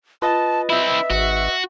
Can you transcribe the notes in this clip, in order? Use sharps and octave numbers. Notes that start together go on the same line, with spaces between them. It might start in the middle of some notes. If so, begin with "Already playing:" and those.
F4 B4 D#5 A5 A6
C4 E4 E5
G#1 F#4